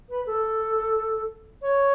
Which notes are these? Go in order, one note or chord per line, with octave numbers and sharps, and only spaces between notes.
B4
A4
C#5